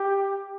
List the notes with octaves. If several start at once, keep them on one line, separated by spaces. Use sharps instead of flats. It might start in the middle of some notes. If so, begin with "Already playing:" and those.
Already playing: G4